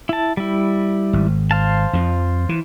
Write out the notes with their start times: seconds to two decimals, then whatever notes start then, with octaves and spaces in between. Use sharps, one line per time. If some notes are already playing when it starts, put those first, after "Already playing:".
0.09 E4 A5
0.37 G3 E4
1.13 G#1
1.51 C5 F5 A5
1.93 F2 F3
2.49 E3